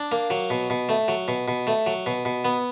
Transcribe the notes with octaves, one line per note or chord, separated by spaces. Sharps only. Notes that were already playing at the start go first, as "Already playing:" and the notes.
Already playing: D4
A#3
F#3
B2
B2
A3
F#3
B2
B2
A3
F#3
B2
B2
B3